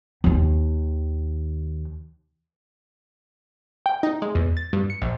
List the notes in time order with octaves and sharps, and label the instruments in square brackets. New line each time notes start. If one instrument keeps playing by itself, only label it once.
[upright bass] D#2 D#3
[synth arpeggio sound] G5
D#4
G#3
E2
A6
G2
C#7
A#1